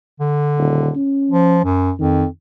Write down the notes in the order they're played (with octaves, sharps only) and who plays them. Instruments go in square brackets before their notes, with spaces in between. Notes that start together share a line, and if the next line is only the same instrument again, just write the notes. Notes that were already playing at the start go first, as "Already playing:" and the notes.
[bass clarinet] D3
[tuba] D#1
C#4
[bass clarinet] F3
F#2
[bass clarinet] F2 [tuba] D#3